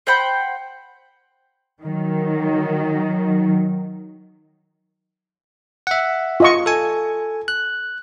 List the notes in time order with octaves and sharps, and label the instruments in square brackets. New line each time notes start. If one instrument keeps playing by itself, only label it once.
[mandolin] C5 F#5 G5 B5
[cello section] D#3 F#3
[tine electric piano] E5 F#5
[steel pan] F4 D#5 C#6
[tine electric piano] A4 G#5
F#6